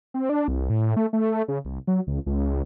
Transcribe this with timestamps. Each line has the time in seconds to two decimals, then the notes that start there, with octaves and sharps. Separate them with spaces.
0.14 C4
0.29 D4
0.48 C2
0.70 A2
0.96 A3
1.13 A3
1.48 C#3
1.65 C2
1.87 F#3
2.07 C#2
2.26 C#2